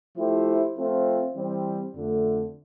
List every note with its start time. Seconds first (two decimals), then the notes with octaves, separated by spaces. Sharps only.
0.15 F3 A3 E4 G4 C5
0.76 F3 A3 C4 F4
1.36 E3 G3 C4
1.95 F2 D3 A3